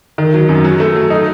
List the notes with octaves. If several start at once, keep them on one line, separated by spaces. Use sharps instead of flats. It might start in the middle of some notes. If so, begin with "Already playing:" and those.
D#3
F#3
F#2
F#3
A3
F#3
D#4